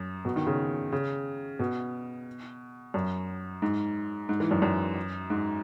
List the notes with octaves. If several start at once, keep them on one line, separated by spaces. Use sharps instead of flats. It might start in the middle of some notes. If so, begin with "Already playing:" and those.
Already playing: F#2
B2
D#3
C#3
C#3
B2
F#2
G#2
G#2
E3
F#2
F#2
G#2